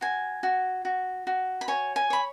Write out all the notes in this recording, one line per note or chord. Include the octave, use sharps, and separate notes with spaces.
F#4 G#5
F#4
F#4
F#4
B5
C#5 G#5
G#5
C#5 B5